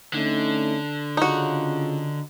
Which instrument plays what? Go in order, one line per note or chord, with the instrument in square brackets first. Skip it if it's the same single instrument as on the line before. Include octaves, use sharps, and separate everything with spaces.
[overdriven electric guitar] D3 [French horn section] A3 C#4 D#4
[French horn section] C#3 F4 [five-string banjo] D#4 F#4